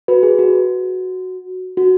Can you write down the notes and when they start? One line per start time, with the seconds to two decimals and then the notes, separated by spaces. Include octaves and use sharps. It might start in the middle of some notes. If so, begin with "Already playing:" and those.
0.08 F#4 B4
0.23 G#4
0.39 F#4
1.77 F#4